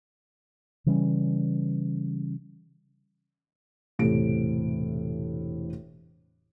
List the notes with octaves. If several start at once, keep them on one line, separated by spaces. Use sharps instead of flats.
C#3 E3 G3 C#4
E1 A2 C3 A4 D7